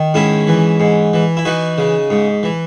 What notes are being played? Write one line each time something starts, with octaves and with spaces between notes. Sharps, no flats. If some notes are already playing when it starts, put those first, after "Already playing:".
Already playing: D#3
G#2 C#4 E4
E3
G#2
E3
E4
E3 D#4 F#4
C#3
G#2
E3